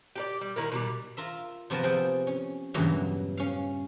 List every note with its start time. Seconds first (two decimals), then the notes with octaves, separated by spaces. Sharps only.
0.15 G4 A4 D5
0.41 G3
0.56 D#3 E4 A#4
0.72 B2 D3 G3
1.17 F4 A#4 E5
1.70 C3 F3 B3 F#4 A#4 A5
1.83 F3 G#4 A4 G5
2.27 C#4
2.74 E2 G2 A#2 C#3 E3 F#3
3.37 C#4 F5